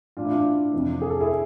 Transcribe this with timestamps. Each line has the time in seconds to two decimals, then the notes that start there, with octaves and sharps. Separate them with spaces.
0.17 A2 E3 D4 F4
0.25 E4
0.30 D4 F4
0.73 F2 C3 E3
1.01 G#4
1.10 A4
1.21 E4 G#4